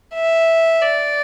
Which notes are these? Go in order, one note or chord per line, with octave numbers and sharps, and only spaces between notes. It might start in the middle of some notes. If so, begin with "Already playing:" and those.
E5
D5